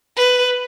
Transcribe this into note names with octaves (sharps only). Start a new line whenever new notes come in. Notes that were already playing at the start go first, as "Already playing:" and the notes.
B4